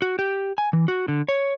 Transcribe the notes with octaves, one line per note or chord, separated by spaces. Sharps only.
F#4
G4
G#5
E3
F#4
D3
C#5